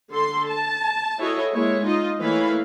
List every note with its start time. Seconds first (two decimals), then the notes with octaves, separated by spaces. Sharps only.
0.12 D3 A4 C6
0.49 A5
1.19 E4 F#4 G#4 A4 C#5 D#5
1.54 G#3 A#3 E4 C#5
1.84 D#4 F4 D#5
2.20 E3 A3 A#3 C#5 F5 B5